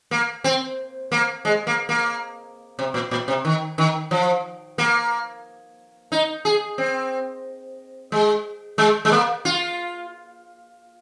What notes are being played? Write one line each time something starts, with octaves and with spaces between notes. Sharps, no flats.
A#3
C4
A#3
G#3
A#3
A#3
C3
A#2
A#2
C3
D#3
D#3
F3
A#3
D#4
G#4
C4
G#3
G#3
G#3
A#3
F4